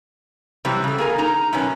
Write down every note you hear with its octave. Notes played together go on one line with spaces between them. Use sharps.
C3 E3 F#3 G3
C#3 A3
A#3 G#4 A#4
D#4 A#5
F#2 B2 D#3 B3 C#4